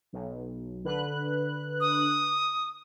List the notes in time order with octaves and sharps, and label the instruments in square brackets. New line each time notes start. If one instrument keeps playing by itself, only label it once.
[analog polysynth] B1
D3 B4 F#6
[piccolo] D#6